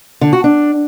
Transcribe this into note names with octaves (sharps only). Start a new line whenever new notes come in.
D3
F#4
D4